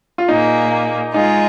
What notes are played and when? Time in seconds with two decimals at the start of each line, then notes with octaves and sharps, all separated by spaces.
0.18 F4
0.28 A#2 A#3 D#4 G#4
1.14 G#3 D#4 F4 G#4